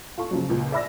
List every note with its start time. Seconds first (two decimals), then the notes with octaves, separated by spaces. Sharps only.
0.17 F4 A4 C#6
0.31 C#3 F3 F#3
0.49 C#2 A#2
0.72 D5 E5 B5 E6 A#6